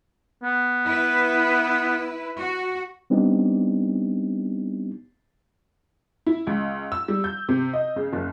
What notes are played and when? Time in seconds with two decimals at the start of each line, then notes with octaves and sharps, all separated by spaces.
0.43 B3
0.85 E4 B4
2.37 F#4
3.10 G3 B3 C4 D4 D#4 G4
6.27 E4
6.47 C#2
6.92 E6
7.08 G3
7.24 G6
7.49 C3
7.73 D#5
7.96 C#3
8.13 F#1